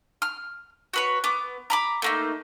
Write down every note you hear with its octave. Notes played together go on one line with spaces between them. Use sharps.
F6
F#4 B4 C#5
B3 D6
A#5 B5 D6
A3 A#3 D#4